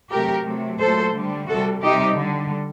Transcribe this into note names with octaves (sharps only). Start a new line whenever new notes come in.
C3 F#3 A3 G4 A#4
C3 F#3 A3
A#2 F#3 A3 A4 C5
D3 G3
C3 G3 F#4 A4
C3 G3 D#4 G4
D3 G3